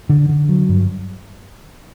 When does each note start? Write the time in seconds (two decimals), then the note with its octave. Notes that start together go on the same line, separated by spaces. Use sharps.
0.09 D3
0.29 D3
0.49 F#3
0.69 G2